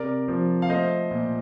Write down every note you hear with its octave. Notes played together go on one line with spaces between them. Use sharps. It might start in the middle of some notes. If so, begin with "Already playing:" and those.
Already playing: C3 A#4 D5
F3
F5
A3 C5 D#5
A#2